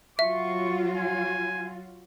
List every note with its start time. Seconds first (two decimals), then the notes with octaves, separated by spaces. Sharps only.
0.19 F#3 F4 F#4 E5 C#6
0.95 G#5